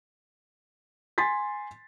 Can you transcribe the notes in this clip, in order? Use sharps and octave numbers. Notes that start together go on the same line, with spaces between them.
G#5 C6 A6 B6